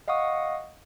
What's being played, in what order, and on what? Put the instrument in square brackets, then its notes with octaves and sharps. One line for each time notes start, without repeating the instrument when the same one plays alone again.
[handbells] D#5 F5 F#5 C#6 D#6